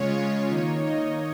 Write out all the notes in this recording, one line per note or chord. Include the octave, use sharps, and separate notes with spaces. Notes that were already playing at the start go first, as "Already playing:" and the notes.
Already playing: C#3 G#3 C#4 F4 C#5
C#5
D#3 A#3 D#4
D#5